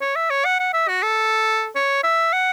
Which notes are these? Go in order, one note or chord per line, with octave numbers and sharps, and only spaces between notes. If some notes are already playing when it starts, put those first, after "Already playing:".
C#5
E5
C#5
F#5
F#5
E5
F#4
A4
C#5
E5
F#5